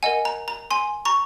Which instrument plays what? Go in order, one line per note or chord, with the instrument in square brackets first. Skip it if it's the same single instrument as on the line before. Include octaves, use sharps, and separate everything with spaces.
[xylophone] A#4 D#5 F#5 G#5
A#5
A#5
G#5 C6
A#5 C#6